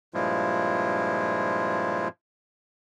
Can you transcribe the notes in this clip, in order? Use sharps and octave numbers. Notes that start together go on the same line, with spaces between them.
G2 A#2 F3 G#3 E4 F4